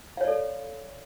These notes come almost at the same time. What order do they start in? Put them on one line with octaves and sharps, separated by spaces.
F5 C#5 D5 A4